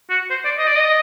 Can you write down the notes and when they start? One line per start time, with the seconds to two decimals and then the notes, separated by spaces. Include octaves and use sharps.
0.10 F#4
0.30 C5
0.45 D5
0.58 D#5
0.67 D5
0.76 D#5